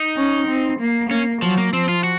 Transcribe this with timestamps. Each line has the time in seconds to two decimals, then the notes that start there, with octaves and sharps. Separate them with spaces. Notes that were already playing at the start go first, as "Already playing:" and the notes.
Already playing: D#4
0.17 C#4
0.48 C4
0.79 A#3
1.10 A#3 C#4
1.42 F3 F#3
1.58 A#3
1.72 F3 C4
1.89 F4
2.04 F#4